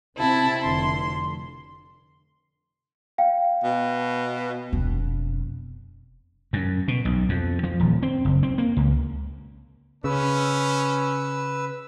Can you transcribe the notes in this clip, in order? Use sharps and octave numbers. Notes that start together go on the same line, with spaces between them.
C3 C4 E4 A5
F1 D3 C6
F5 G5
B2
E1 F2
F#2
B2
B1
F2
F3
D#1
C4
F#1
C4
A#3
C#2
C#3 C#4 B4 E6